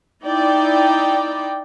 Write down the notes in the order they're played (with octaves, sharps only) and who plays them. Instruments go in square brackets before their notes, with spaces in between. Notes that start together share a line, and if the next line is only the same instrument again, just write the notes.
[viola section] D#4 E4 D5 G5